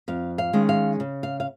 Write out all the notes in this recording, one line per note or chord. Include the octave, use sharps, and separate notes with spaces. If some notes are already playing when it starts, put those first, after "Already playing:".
F2 F5
F5
D#3 G#3 C#4
F5
C#3
F5
F5